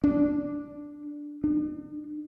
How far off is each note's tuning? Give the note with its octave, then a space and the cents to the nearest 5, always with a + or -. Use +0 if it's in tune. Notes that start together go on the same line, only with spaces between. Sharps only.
D4 +0
D4 +40